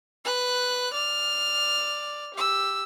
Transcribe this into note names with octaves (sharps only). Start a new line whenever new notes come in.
B4 F#6
D5 F6
G4 E6